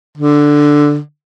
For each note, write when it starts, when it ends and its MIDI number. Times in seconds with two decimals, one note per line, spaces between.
0.18 0.98 50